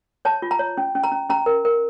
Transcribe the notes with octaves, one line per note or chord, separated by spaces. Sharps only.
C#5 A5
F4
A#5
C#5
C#4
C#4
A#5
C#4
C#4 A#5
A#4
A#4